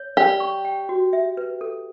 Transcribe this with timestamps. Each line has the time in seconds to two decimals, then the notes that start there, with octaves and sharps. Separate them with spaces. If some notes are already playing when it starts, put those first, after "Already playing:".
Already playing: C#5
0.17 G4 D5
0.40 C#6
0.65 G5
0.89 F#4
1.13 E5
1.37 B4
1.61 A4